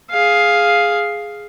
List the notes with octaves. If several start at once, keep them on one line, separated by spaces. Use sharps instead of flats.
G#4 F5